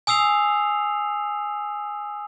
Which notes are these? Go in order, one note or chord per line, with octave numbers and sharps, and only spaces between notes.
G#5 D#6 E6 C7 F7